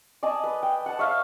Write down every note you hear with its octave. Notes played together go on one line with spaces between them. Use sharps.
D5 D#5 G#5 A5
B4
G5
F#5 A5
C#5 E5 F5